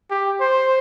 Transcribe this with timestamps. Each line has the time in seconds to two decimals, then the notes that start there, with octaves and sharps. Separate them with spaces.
0.11 G4
0.41 C5